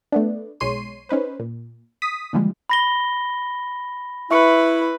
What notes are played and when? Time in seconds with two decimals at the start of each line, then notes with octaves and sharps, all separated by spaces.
0.12 A3 B3 D4
0.60 B1 G#3 C#5 C6 C7 D#7
1.09 C#4 D#4 B4 C5
1.39 A#2
2.02 D#6 B6
2.33 A#2 D3 E3 F3 G3 G#3
2.70 B5 A#6 G7
4.31 E4 B4 E5 C#6 C#7